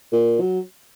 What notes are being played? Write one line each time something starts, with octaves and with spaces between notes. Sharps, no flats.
A#2
F#3